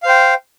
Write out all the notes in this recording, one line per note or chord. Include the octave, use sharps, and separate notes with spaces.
C5 F5 G5